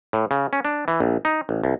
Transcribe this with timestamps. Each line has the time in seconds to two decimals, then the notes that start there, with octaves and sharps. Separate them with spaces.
0.13 A2
0.31 C#3
0.53 C#4
0.65 D4
0.88 E3
1.00 A#1
1.25 D#4
1.49 A1
1.64 C2